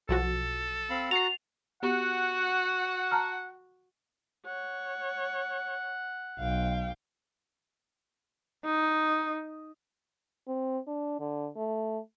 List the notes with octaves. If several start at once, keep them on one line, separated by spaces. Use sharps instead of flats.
B1 F3 F#4 A4
C4 F5 B5
F#4 F#5 A#5 A6 C7 F7
B3 F#4 G4 F#5
A5 A#5 F6
C#5 F#5
B1 F5 G5
D#4
C4
D4
D3
A3